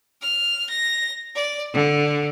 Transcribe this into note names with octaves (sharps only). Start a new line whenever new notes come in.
F6
A#6
D5
D3